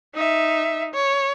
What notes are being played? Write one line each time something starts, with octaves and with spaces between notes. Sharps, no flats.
D#4 E5
C#5